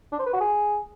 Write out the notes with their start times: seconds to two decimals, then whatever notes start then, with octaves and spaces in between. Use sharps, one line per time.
0.12 D4
0.19 C5
0.26 B4
0.33 F#4
0.40 G#4